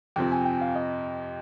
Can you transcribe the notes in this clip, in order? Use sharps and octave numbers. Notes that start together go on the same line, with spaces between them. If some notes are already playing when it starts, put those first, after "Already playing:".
F2 C3 F3 C4 G5
G#5
G5
F5
D#5